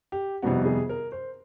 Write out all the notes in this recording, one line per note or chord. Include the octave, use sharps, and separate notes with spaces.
G4
F2 C3 D#3 G3 B3 F#4
G#4
A#4
C5